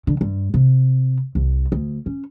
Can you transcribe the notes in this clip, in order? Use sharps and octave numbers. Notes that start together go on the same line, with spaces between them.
D3
G2
C3
C2
D2
C#4